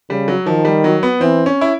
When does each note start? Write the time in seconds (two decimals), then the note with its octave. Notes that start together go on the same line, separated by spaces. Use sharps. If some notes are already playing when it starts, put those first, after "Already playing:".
0.10 C#3 G3
0.28 F#3
0.46 D#3 F3
0.65 G3
0.84 F#3
1.03 B3
1.21 E3 C4
1.46 C#4
1.61 E4